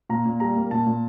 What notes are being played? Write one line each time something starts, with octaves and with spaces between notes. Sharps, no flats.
A#2 A#5
A#2
G3 A#5
A#3
A#2 A5
A#2